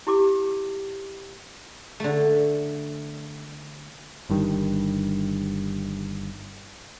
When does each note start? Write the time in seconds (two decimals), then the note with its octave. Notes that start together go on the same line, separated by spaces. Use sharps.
0.07 E4 G4 D6
2.00 D3 A3
4.30 G1 G2 D#3